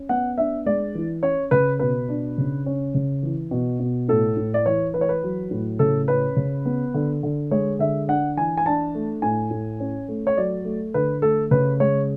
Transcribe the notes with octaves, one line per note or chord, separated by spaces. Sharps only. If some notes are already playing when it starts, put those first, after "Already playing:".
Already playing: C#4
B3 F#5
D4 E5
G#3 D5
E3
C#4 C#5
C#3 B4
B2 B4
D4
C#3
C#4
C#3
E3
B2
B2
A2 A4
A2
D5
E3 C#5
E3 B4
C#5
B4
F#3
A2
C#3 A4
C#4 B4
C#3
B3
D3
D3
G#3 C#5
D3 E5
D4 F#5
E3 G#5
G#5
D4 A5
A3
A2 G#5
A2
C#4
A3
C#5
F#3 D5
A3
D3 B4
A3 A4
C#3 B4
G#3 C#5